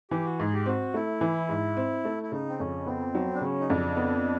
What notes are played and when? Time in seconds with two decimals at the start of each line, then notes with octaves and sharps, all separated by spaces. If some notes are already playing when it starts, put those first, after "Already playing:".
0.11 E3 G4
0.25 F#4
0.39 G#2 G#4
0.53 G4
0.66 C4 F#4
0.94 A3 E4
1.21 E3
1.49 G#2
1.77 C4
2.05 A3
2.23 E4
2.32 C#3 D#4
2.49 C4
2.59 F2 C#4
2.86 B3 C4
3.15 F#3
3.35 D4
3.41 C#3 C#4
3.60 D#4
3.69 F2 D4
3.97 B3